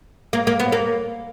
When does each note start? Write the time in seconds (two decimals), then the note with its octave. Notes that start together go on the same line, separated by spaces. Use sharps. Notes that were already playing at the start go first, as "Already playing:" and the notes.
0.33 A#3
0.47 A#3
0.60 B3
0.72 A#3